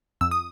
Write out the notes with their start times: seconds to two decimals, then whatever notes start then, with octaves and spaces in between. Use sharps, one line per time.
0.21 F2 E6
0.31 D#6